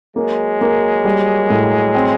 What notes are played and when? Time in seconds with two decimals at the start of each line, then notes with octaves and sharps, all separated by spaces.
0.16 F#3 G#3 A#3
0.61 A#3
1.05 G3
1.50 A2
1.95 C4